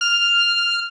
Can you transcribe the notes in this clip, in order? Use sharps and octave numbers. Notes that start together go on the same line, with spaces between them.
F6